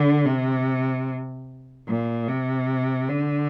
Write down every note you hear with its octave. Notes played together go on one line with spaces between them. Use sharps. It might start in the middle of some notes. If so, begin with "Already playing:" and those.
Already playing: D3
C3
A#2
C3
D3